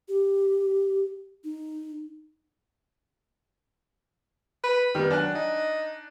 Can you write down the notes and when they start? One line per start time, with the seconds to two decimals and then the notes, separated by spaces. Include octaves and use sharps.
0.09 G4
1.44 D#4
4.64 B4
4.95 D#3 G3 B3
5.10 F#3 D4 G#5 F#6
5.35 D#4